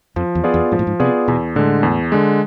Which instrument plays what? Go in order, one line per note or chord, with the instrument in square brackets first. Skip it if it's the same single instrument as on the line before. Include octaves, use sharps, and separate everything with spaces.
[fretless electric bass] F2 [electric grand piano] F3
[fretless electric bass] E2
[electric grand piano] B3 F4 G#4 D5
[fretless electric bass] E2
[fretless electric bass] G#2 [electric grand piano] F3
[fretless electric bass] A2
G#2
[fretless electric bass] C3 [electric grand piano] B3 F4 G#4 D5
[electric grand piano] E2 [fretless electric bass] B2
[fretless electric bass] A2 [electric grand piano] D3 G#3
[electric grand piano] E2
D3 G#3